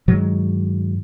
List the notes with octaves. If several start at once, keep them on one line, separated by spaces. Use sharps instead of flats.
G2 D#3 F#3 G#3